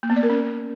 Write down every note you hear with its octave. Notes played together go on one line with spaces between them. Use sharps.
A#3
B3
D5
A#4
C#4